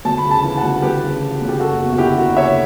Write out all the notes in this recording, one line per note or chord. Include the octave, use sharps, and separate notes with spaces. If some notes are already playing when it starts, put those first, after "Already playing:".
D2 A5
B5
C#3
A5
E3 B5
F#5 A5
D2
D2 G4 B4
C#3
E3
D2
G4
F#1 F#4 A4
E2 F#4
F#4
D3 E4 G4
F#1 F#4
F#1 C#5 E5